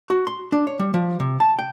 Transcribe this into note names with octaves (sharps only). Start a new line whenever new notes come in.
F#4
C6
D4
C#5
G3
F3
C3
A5
G5